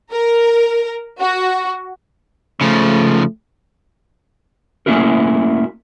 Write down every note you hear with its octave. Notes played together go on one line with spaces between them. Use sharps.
A#4
F#4
C#3 F3 A3
A3 A#3 C#4 E4 F#4 A#4